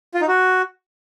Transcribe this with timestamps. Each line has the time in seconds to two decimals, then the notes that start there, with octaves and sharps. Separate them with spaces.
0.14 F4
0.21 D#4
0.28 F#4